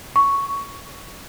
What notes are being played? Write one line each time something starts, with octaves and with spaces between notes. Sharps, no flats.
C#6